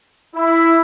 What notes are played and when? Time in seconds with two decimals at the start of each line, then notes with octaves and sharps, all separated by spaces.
0.35 E4